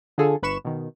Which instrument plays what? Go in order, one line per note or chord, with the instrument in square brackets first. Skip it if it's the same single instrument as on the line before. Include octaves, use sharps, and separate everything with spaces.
[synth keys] D3 F4 G#4 A4
G1 B4 B5 C#6 E7
B2 D#3